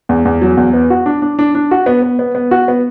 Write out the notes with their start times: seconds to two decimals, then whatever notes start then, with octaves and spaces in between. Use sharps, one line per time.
0.09 E2
0.25 E2
0.42 F#3
0.57 E2
0.74 B3
0.90 F#4
1.06 D4
1.22 D4
1.39 D4
1.55 D4
1.71 F#4
1.86 B3
2.02 B3
2.19 B3
2.35 B3
2.51 F#4
2.68 B3